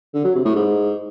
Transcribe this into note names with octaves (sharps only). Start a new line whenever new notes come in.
D3
F#3
C3
A2
G#2